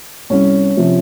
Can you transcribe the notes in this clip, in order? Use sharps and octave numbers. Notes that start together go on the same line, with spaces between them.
C2 C#4
C3 F3